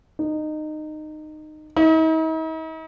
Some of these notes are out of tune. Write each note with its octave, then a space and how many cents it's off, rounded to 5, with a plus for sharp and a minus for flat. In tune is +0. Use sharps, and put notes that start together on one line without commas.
D#4 -20
D#4 +45